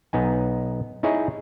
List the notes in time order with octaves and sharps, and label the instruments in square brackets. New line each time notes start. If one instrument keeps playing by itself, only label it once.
[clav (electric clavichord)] B1 B3 D#4 G#5
D#4 E4 G#4 C#5 D#5